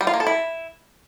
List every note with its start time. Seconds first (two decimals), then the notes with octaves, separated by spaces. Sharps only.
0.01 G3
0.07 F4
0.14 A#3
0.20 A4
0.27 E4